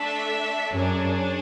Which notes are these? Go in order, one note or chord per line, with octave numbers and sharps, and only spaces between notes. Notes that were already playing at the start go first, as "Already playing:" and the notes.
Already playing: A3 D4 A4 E5
F#2 D4 G#4 C#5